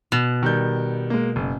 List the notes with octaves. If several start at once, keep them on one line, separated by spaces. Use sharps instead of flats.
B2
D#3 G3 G6
G#3 A#3
F#1